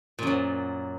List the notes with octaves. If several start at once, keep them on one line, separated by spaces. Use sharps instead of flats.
F#2 A#2 F#3